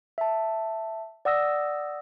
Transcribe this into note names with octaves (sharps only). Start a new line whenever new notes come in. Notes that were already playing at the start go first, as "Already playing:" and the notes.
E5 A5
D5 F#5 D#6 E6 A#6